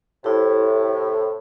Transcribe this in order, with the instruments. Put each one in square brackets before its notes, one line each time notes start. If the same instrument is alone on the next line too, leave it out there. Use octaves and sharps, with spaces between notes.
[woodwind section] A2 C3 [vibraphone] E4 G4